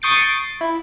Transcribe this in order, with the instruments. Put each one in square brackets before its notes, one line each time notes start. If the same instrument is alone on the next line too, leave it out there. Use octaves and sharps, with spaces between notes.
[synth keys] C#6 D#6 G6 A6 C7 D7
E4